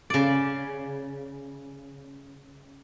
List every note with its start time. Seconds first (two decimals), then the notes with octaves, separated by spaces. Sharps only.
0.10 C#3 D5